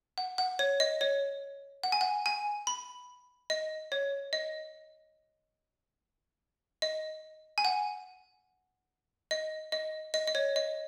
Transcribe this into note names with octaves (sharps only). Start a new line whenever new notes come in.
F#5
F#5
C#5
D#5
C#5
F#5
G#5
F#5
G#5
B5
D#5
C#5
D#5
D#5
G#5
F#5
D#5
D#5
D#5
D#5
C#5
D#5